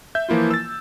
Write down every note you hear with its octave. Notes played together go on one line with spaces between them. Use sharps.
E5 G6
E3 F3 A#3 E4 F4
E6 A6